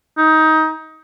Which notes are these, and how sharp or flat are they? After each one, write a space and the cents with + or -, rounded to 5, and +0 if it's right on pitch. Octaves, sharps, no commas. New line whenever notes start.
D#4 +20